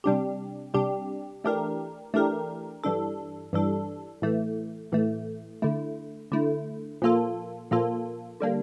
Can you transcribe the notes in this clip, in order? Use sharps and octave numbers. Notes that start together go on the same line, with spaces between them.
C3 G3 D4 G4
C3 G3 D4 G4
E3 A3 D4 G4 A#4
E3 A3 D4 G4 A#4
G2 E3 G3 D4 A4
G2 E3 G3 D4 A4
A2 E3 A3
A2 E3 A3
D3 A3 E4
D3 A3 E4
A#2 F3 A#3 F4 A4
A#2 F3 A#3 F4 A4
D3 G3 A#3 D4